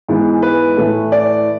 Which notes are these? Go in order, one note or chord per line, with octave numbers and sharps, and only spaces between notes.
G#2 E3 G#3 B3
B4
A2 E3 A3
D5